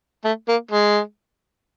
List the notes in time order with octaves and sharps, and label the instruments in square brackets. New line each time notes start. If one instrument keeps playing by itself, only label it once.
[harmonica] A3
A#3
G#3